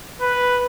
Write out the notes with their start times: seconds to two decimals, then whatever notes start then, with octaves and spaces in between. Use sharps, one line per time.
0.21 B4